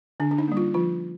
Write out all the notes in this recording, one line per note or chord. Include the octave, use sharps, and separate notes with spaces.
D3 D4
D4
D#4
G3 A#3
F4
F3 F4